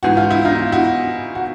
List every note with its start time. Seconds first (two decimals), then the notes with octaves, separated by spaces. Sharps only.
0.03 G#2 E3 F#4
0.17 F4
0.30 E4
0.45 D#4 F4
0.72 E4 F#4
1.35 F#4